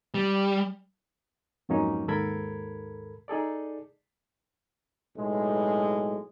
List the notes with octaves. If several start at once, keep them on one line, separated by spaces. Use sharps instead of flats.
G3
F2 G#2 F#3 A#3 C#4 D#4
D#2 G#2 A4 A#4 B5 G#6
D#4 G#4 A4 D5
B1 A2 G#3